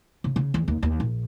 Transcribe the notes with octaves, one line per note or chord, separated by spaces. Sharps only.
C#3
C#3
E2
D#2
D#2
A#1